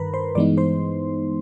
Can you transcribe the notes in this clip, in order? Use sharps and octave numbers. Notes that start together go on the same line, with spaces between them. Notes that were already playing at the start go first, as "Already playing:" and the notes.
Already playing: G2 D#3 A#4 B4 A#5 B5
C5 C6
G2 E3 G#3 B3 D#4 D5 D6
C5 C6